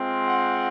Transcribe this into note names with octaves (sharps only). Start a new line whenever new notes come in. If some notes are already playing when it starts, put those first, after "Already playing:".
Already playing: G#3 C4 F4
F#5